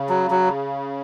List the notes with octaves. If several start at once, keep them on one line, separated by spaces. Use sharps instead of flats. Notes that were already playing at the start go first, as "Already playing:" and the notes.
Already playing: C#3
F#3
F#3